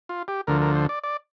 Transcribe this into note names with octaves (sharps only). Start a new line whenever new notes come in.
F4
G4
D2 D3 F3 A#4
A#4
C5
D5
D5